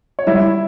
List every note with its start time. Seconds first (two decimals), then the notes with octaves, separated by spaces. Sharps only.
0.19 C#5
0.27 G3 E4 E5